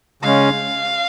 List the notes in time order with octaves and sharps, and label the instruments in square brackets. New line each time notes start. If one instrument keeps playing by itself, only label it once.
[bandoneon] C#3 G#3 C#4 [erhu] F5